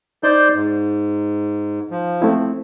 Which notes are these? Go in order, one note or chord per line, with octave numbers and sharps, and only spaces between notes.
D#4 C5 D5 G6
G#2
F3
A3 C4 E4